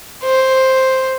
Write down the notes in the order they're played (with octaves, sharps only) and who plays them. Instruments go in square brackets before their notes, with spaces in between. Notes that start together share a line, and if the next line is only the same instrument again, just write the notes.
[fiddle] C5